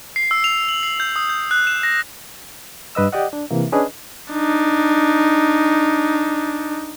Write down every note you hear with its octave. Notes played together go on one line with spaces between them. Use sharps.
C7
E6
F7
F#7
C7
G6
D#6
G6
F#6
E7
A#6
G2 B4 D#5 E6
G4 D5 D#5 F#5
D4
C3 E3 A#3
C#4 D4 G#4 B4 D#5
D4 D#4